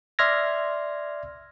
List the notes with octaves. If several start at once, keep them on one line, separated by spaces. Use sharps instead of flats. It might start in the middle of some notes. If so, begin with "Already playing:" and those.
D5 E5 C6 F6 G#6 A#6